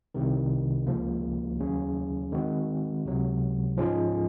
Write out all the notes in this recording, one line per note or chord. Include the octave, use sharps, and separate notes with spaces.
C2 C3 D#3
C#2 C#3 F3 A#3
D#2 C#3 F#3 C#4
D#3 G#3 C4 F#4
C#2 C3 F#3
G#2 F3 G#3 C#4 F4